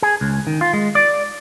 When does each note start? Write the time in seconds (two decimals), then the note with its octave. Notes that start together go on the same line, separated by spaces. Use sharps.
0.02 G#4
0.21 C#2
0.47 D#3
0.61 F4
0.73 G#3
0.95 D5